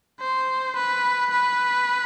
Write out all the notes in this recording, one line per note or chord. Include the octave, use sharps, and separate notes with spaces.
C5
B4
B4